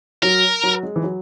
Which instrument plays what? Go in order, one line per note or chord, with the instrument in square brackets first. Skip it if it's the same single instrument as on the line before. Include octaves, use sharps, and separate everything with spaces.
[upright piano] F#3 [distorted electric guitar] A#4
[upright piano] F#3
G#3
E3
F#3